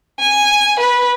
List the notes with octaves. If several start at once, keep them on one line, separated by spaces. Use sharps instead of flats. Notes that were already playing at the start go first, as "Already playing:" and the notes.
G#5
B4